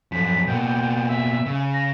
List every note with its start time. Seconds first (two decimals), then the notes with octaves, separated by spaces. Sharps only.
0.12 F#2 F3 B6
0.47 B2 A#3 G5
1.07 E5
1.46 C#3
1.74 A#6